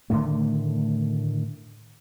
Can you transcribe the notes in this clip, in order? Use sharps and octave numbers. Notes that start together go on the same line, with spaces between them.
A2 D3 D#3 A3